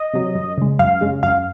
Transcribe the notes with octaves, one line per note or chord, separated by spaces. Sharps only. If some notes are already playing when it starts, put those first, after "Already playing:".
Already playing: D#5
C3 F#3
F#2
C#3 G#3
F#2 F5
C#3 G#3
F#2 F5